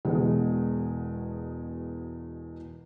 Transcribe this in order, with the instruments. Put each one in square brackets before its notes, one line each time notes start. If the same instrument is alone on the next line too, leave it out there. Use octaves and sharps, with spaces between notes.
[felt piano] E1 E2 B2 G#3